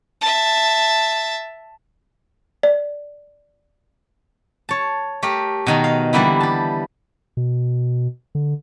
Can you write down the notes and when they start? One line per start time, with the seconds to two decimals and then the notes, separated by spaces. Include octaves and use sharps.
0.21 E5 A5
2.63 D5
4.69 C#5 A5
5.23 A3 G4 A#4
5.67 B2 D#3 D#4
5.84 F5
6.13 D3 E3 G3 A#3 B3 E4
6.40 G4 A5
7.37 B2
8.35 D3